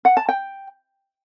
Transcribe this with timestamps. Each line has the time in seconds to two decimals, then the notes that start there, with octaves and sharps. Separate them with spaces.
0.05 F#5
0.17 A5
0.29 G5